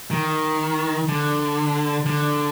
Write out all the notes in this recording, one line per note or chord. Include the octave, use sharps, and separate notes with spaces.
D#3
D3
D3